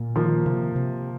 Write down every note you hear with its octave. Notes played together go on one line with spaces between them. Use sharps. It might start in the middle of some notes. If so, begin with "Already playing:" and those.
Already playing: A#2
D#3 F3 A#3
C3
C3